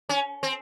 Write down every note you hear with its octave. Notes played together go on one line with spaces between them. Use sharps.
C#4
C4